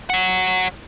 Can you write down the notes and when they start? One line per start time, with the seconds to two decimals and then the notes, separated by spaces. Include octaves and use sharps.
0.10 C#5 F#5